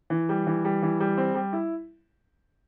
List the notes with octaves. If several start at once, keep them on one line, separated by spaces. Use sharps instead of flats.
E3
G3
E3
G3
E3
G3
C4
G3
E4